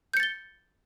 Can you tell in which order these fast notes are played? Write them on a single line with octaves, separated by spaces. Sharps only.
G6 C#7 A6 G7